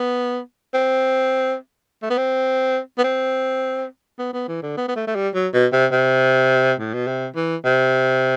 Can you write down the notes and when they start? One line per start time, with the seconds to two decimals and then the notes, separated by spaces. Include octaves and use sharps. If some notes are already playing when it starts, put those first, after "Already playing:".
Already playing: B3
0.74 C4
2.03 A3
2.10 B3
2.18 C4
2.98 B3
3.04 C4
4.19 B3
4.33 B3
4.48 E3
4.62 D3
4.77 B3
4.88 B3
4.96 A3
5.07 A3
5.15 G3
5.34 F#3
5.53 B2
5.73 C3
5.92 C3
6.80 A2
6.93 B2
7.07 C3
7.36 E3
7.65 C3